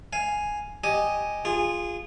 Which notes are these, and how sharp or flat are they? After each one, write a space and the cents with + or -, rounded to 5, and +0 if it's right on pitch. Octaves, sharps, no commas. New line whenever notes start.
F5 +0 G#5 +0
G4 +0 D#5 +0 G#5 +0
F4 +0 G#4 -20